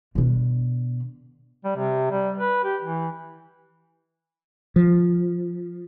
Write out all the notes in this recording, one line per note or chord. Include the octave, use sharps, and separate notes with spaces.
B2 D3
G3
C3
G3
B4
G4
E3
F3